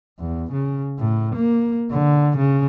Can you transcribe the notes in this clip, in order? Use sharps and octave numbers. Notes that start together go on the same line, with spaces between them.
E2
C#3
A2
A#3
D3
C#3